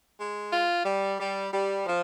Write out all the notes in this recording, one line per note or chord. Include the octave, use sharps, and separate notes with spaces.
G#3
F4
G3
G3
G3
F3